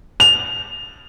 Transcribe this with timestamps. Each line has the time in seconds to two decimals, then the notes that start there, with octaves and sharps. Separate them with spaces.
0.20 F7